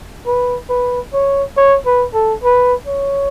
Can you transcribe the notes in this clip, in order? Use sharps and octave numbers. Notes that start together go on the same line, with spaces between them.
B4
B4
C#5
C#5
B4
A4
B4
C#5